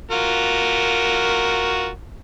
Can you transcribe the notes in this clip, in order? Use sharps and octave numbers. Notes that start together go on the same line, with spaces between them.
F4 F#4 A#4